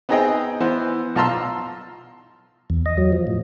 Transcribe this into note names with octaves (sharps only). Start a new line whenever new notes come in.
B3 C4 D#4 G#4 D#5 G5
E3 B3 C5
B1 F4 A5 A#5 C6 E6
E2
D#5
F#3
F3
A2